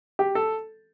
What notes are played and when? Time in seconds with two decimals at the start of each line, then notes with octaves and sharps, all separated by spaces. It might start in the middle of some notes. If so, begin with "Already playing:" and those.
0.19 G4
0.35 A4